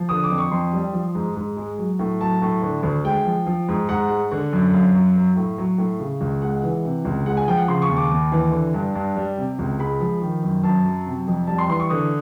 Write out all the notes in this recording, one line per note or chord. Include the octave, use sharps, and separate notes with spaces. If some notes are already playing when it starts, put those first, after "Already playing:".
Already playing: F3
D3 D#6
D6
F2
C#6
F2 C6
G3
F3
G#2
G#2
G#3
F#3
A2
F#3 A5
A2
D3
D2
G#3 G5
F3
F3
G#2
G#2 F#5
G#3
D3
F#2
F#2 F5
F#3
F#3
A2
F#3
A2
C#3
C#2
G#3 F#5
E3
C3
C#2
G#3 F#5
G#5
F3 G5
F#5
C#3 C6
C#6
D#2
D6
D#2
E3
D3
G2
G2
G3
C3
C#2
G#3 B5
F3
D#3
F#2
F#2 A5
F#3
C3
F2
G3 A5
C6
E3 C6
C#6
D3 D#6